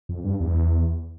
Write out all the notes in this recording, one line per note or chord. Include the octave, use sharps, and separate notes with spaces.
F2
G2
E2